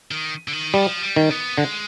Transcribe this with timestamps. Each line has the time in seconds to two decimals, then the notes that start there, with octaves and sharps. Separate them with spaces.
0.11 D#3
0.48 D3
0.53 D#3
0.74 F3 G3
1.02 G3
1.16 D#3
1.30 B3
1.58 D3 G#3